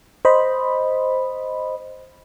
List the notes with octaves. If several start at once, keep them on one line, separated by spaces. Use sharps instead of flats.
C5 D#5 B5